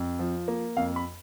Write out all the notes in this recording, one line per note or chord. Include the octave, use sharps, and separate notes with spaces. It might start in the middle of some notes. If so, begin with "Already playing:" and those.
Already playing: F2
F3
A#3
F2 F5
B5